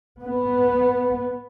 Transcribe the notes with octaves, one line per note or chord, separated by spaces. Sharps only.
B3